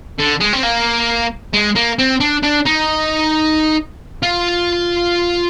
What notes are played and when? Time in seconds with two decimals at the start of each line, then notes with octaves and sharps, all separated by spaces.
0.19 D3
0.41 G#3
0.53 C4
0.63 A#3
1.53 G#3
1.75 A#3
1.99 C4
2.20 D4
2.43 D4
2.65 D#4
4.23 F4